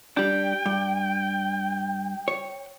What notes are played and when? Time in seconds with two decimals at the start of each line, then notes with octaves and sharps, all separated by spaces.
0.17 G3 D4 G5
0.66 G2
2.28 C#5